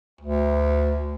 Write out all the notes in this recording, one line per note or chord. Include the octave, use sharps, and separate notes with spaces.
D2